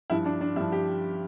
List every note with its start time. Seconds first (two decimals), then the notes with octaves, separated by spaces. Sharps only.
0.10 G2 F3 E4
0.26 D4
0.41 D4
0.56 G2 F3 E4
0.72 G4